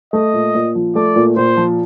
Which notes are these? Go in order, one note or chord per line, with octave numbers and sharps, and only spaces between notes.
A3 D#5
A#2
A#2
F3
A3 D5
A#2
A#2 C5
F3